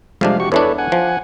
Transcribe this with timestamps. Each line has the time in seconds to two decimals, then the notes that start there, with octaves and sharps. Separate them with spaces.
0.21 F2 C3 G3 G#3 D4 F5
0.40 F#4 G4 C#6
0.52 E2 E3 D4 A4 B4 C#5
0.78 F#5 G#5
0.92 F3